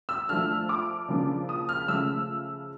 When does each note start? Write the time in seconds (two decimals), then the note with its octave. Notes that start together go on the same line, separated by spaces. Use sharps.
0.09 E6
0.29 F3 A3 D4 F6
0.69 D6
1.08 C#3 F3 A#3 D4
1.49 D#6
1.69 F6
1.88 C#3 F3 A3 E6